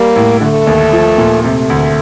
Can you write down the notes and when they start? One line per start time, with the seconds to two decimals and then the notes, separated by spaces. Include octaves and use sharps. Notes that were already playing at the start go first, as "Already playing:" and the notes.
Already playing: G3 A#3
0.15 A2
0.40 D3 A3
0.67 D#2
0.93 F3
1.18 A#2
1.43 C3 A3
1.70 D2